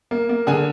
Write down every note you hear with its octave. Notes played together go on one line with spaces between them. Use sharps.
A#3
A#3
D3 G#4 G#5